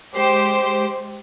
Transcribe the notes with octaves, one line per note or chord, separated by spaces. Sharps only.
G#3 G4 C5